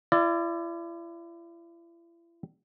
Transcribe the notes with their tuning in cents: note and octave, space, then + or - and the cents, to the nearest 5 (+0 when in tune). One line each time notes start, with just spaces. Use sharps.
E4 +40 D5 +10